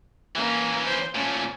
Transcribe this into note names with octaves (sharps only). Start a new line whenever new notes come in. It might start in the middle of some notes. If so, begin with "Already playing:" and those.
E3 A#3 C#4
C5
A#2 A3 C#4